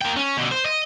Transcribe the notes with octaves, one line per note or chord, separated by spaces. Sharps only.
A#3 G5
C#4
B2 D3
C5
D#5